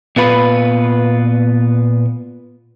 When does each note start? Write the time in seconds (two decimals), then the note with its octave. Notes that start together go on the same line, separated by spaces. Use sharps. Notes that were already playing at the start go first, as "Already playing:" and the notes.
0.16 A#2 B3 F4 B4